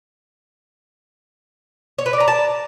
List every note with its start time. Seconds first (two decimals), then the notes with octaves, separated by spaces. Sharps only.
1.98 C#5
2.06 B4
2.13 D5
2.20 A#5
2.28 A5